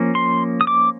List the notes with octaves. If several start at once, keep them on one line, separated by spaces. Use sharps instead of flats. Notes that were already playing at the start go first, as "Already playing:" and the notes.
Already playing: F3 A#3 C#4
C6
D#6
D6